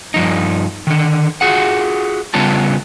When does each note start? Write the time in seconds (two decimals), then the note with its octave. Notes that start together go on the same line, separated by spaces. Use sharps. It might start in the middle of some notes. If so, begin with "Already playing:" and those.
0.14 G2 F3 D#4
0.87 D3 D#3
1.41 F4 F#4 G#4 F#5
2.34 C#3 G3 B3 C#4 F4 A5